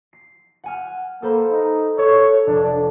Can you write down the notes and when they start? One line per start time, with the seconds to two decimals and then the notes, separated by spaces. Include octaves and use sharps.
0.13 C7
0.64 F#5 G#5 F6
1.22 A#3 A4 C5 B5
1.51 D#4
1.98 A4 C#5
2.47 F1 D4